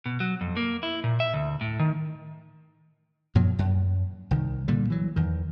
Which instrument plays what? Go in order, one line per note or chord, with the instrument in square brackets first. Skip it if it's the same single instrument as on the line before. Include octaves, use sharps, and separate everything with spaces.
[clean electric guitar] B2
F#3
F2
A#3
E4
A#2
E5
D2
A2
D#3
[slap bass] F#2 A#2 F3 F#3
F#2
C2 D#3
A#2 D3 G3
E3 F#3
E2 D#3